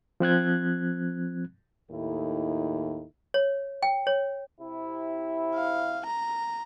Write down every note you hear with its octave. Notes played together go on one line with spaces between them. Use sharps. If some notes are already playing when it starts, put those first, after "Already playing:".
F3 C4 F#6 G#6
D#2 A2 D#4 E4 A4
C#5
G5
C#5
C3 E4
F5
A#5